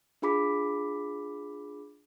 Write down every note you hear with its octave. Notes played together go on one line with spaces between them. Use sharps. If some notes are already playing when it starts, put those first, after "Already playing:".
D4 F4 G#4 B5 D6 B6